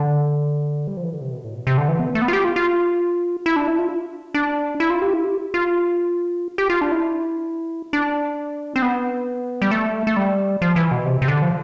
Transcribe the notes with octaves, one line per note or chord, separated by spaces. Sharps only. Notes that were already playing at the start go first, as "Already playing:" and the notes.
Already playing: D3
G3
F3
E3
D3
C3
B2
A2
B2
C3
D3
E3
B3
A3
B3
F4
G4
F4
F4
E4
D4
E4
F4
D4
E4
F4
G4
E4
G4
F4
G4
F4
D4
E4
D4
C4
B3
G3
A3
A3
G3
F3
E3
B2
C3
C3
D3
F3